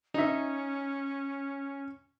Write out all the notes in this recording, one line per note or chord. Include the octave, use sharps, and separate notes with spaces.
C#4 D#4 E5